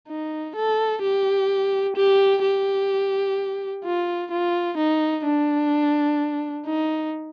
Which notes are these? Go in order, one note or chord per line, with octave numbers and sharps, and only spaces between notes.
D#4
A4
G4
G4
G4
F4
F4
D#4
D4
D#4